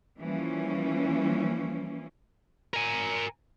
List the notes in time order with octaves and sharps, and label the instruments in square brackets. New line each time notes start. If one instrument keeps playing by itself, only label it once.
[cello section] E3 F3 G3 A#3 C#4
[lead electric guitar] A#4 G#5